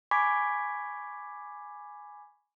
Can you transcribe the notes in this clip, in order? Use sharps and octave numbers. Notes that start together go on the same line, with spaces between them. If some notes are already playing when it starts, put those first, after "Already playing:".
G#5 B5 C#6 D6 G#6 B6